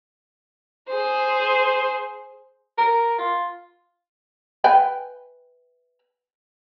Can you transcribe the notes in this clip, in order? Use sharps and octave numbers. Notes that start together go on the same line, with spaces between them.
G#4 C5
A#4
F4
B4 G5 G#5